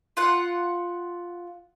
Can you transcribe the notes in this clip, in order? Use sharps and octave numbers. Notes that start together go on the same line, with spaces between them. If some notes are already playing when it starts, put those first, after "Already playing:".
F4 F#5